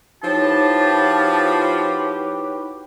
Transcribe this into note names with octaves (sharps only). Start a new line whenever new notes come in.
F3 D#4 E4 F#4 G4 B4 C#5 A5